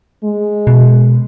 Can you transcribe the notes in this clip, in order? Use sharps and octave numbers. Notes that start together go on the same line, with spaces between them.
G#3
B2